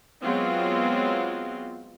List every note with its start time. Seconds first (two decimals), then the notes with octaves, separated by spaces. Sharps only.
0.23 F#3 G#3 B3 C4 F4